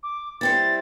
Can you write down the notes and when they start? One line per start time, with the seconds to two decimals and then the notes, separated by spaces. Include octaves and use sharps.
0.03 D6
0.41 G3 C4 E4 A6